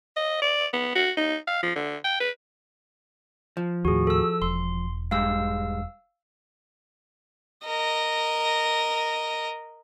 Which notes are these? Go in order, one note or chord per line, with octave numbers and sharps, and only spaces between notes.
D#5
D5
B3
F#4
D#4
F5
F3
D3
G5
B4
F3
D#2 A2 F#4 G#4
A4 E6
E1 C6
G#2 G3 G#3 F5 E6
A#4 D#5